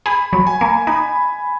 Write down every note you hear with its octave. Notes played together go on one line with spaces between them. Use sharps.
G#4 B5
F#3
G#5
A#3
D#4 B5